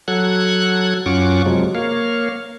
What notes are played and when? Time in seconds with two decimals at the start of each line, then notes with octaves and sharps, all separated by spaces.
0.08 F#3 A4 F#5 F#6 G#6
1.06 F#2 C#4 F4 F#5 C#6 D6
1.46 C3 F3 F#3 G#3
1.75 A#3 C#5 F5